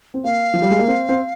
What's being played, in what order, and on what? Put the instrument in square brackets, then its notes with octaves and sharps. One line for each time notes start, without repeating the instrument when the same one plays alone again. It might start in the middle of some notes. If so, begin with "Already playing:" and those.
[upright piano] C4
[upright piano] A#3 [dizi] F5
[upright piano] F3
G3
G#3
A#3
C4
C4